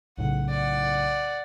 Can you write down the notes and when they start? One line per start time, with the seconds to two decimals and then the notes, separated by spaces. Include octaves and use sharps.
0.17 B1 A2 C#3 F#5
0.49 D5 F#5